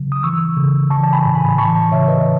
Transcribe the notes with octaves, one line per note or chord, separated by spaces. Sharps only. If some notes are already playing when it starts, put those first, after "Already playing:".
Already playing: C#3 F#3
D#6
E3 C#6 E6
C#3
E3 A5 C#6
A5
G#5 B5
A2
G#5 B5
E3 A5 C#6
A5 C#6
C#3 C#5 E5
B4 D#5